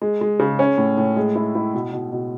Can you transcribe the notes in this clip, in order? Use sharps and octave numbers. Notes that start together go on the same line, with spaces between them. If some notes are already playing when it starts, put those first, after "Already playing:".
G#3
G#3
C#3
C#4
A2
A2
G#3
E4
E4
B2
B2
B2